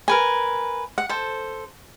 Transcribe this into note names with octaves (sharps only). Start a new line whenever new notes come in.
A#4 B4 G#5
F#5
A4 C5